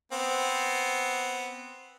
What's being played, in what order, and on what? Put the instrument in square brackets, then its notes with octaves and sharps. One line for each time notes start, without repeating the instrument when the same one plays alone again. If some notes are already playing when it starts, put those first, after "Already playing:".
[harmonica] B3 C4